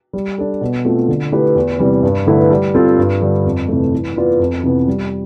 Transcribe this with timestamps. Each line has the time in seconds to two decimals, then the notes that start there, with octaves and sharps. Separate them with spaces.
0.13 G3
0.38 D4 A4
0.61 B2
0.85 A3 C4 F4
1.08 D3
1.32 A3 E4 G4 B4
1.55 E2
1.79 C3 E3 G3
2.03 G2
2.27 D3 A3 E4 B4
2.51 G3
2.74 C4 F4 A4
2.98 G2
3.22 D3 G3
3.45 F2
3.68 C3 E3 A3
3.93 E3
4.16 B3 F4 B4 D5
4.40 F2
4.63 C3 E3 B3
4.88 G3